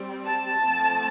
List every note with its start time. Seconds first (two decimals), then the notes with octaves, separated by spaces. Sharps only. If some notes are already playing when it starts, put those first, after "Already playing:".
Already playing: G3 C4
0.26 A5
0.63 F3 A3 C4